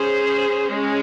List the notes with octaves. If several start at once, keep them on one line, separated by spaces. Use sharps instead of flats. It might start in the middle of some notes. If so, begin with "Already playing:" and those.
Already playing: C#4 G#4 C5
G#3 C#4